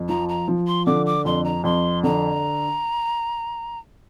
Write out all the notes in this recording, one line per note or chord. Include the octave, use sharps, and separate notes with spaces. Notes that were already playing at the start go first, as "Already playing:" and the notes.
Already playing: F2
F3 A#5
A#5
F3
C6
D3 D6
D6
F2 C6
A#5
F2 C6
D3 A#5